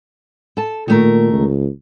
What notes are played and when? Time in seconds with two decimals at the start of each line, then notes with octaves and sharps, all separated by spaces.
0.57 A4 A5
0.88 A#2 D#3 A3 A#4
1.32 C#2